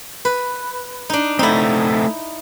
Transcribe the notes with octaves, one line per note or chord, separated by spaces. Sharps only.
B4
D4 D#4
A3 C4 D#4 E4